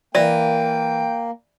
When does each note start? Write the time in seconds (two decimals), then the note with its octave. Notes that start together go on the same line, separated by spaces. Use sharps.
0.15 E3 A#3 D5 E5 G5